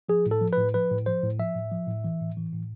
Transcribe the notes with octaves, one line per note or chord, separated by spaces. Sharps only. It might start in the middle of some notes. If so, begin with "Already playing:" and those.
F3 G#4
A2
A4
F3
A2 B4
F3 B4
A2
F3 C5
A2
F3 E5
A2
F3
A2
E3
A2
E3
A2